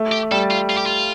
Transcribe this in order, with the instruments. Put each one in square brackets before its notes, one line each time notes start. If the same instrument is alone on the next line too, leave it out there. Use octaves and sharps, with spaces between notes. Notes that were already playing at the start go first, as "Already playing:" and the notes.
Already playing: [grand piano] A3
[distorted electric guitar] G4
[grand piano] G3 [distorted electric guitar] A4
[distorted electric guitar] F4
F4
G4
F4